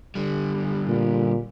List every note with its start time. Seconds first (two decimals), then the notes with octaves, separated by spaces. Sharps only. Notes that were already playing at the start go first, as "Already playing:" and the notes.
0.15 D3 G3
0.88 A#2